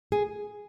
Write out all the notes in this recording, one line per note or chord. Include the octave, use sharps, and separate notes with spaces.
G#4